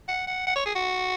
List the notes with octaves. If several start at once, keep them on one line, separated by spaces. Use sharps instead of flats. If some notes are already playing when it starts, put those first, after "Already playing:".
F#5
F#5
F#5
C#5
G#4
F#4